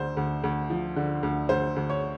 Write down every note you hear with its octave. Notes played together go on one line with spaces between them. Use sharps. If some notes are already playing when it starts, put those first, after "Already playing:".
Already playing: D2 D3 C5
D2
D2
F3
D3
D2
D2 C5
D2
C#5